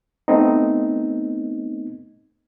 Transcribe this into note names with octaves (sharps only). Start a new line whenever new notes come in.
A3 B3 C4 D#4